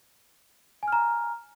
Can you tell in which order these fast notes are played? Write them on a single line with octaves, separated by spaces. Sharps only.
G#5 F6 A#5